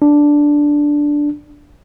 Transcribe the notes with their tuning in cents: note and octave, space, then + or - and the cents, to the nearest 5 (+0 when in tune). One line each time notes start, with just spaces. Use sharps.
D4 -5